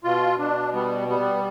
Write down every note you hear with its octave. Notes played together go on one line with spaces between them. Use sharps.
B2 F4
B2 D4
G3 B3
G3 B3